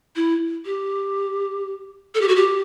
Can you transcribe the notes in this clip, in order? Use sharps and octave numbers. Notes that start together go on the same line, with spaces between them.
E4
G4
A4
G4
F#4
G4